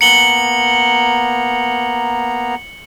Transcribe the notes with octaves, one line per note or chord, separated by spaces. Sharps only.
A#3 B3 A#5 C#7 F#7 G7